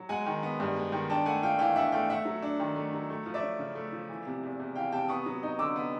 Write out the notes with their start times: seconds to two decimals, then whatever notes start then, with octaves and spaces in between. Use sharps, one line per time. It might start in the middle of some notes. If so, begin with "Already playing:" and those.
Already playing: F#3
0.09 G#3 F#5 G#5
0.26 D#3
0.43 B3
0.60 G2
0.76 G#3
0.92 D#3
1.10 D4 G5 A5
1.25 A3 F#5 G#5
1.43 F4 F5 G5
1.59 E3 F5 G5
1.76 D4 E5 F#5
1.92 A3 F5 G5
2.10 A3 E5 F#5
2.25 F#3
2.42 D4
2.59 D#3
2.75 A3
2.93 F#3
3.10 A3
3.26 F3
3.34 D5 E5
3.43 C#4
3.59 C#3
3.75 A3
3.92 F3
4.09 E3
4.26 C3
4.43 E2
4.60 E2
4.76 E3 F5 G5
4.92 C3 G5 A5
5.08 B3 C#6 D#6
5.26 F#3
5.43 D#4
5.59 D3 D6 E6
5.76 B3